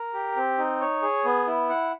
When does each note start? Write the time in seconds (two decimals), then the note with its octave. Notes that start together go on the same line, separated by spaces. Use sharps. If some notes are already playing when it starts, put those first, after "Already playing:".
Already playing: A#4
0.14 G4
0.36 C4
0.58 D#4
0.80 C#5
1.02 G#4
1.25 B3
1.47 E4
1.69 F#5